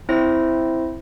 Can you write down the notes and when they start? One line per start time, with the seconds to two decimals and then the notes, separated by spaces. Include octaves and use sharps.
0.09 C4 E4 C5 E5 A#6